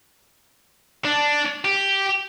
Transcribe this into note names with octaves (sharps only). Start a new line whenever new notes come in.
D4
G4